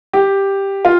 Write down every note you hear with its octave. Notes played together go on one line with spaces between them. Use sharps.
G4
F4